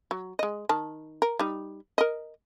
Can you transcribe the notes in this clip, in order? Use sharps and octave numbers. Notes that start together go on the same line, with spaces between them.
F#3
G#3 D#5
D#3 A5
A#4
G3 D#4
A#4 D#5